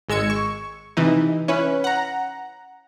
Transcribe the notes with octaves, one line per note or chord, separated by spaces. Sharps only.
G#1 G#3 E6 G#6 C#7
C#6
C3 E3 D#4
C#4 E4 B4
F#5 A#5